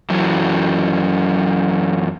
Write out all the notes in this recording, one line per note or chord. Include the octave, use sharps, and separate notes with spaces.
F#2 E3 F#3